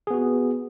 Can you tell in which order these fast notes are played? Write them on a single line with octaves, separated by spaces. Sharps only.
G#4 B3 F#4